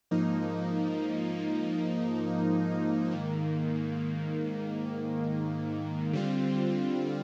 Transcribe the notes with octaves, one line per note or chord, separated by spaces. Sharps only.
G#2 F3 A#3 D#4
G#2 D#3 A#3
D3 G3 C4 F4